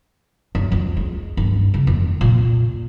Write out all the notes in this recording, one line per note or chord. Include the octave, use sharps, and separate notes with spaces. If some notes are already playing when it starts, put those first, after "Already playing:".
F#2
F2
G#3
G2
C#3
F2
A#2